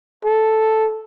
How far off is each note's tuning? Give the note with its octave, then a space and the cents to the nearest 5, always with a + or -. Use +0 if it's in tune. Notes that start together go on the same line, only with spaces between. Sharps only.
A4 -5